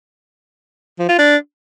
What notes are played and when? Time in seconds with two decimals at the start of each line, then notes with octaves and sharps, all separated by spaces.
0.99 F3
1.09 F4
1.18 D4